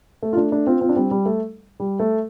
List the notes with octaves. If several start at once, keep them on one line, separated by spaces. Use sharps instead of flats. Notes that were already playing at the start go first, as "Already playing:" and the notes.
A3
F4
A3 D4
A3 D4
C4 F4
C4 F4
D4
G3 C4
G3
A3
G3
A3